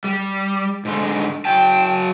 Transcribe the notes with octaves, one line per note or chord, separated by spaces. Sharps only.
G3
G#2 D3 D#4
F#3 G5 A5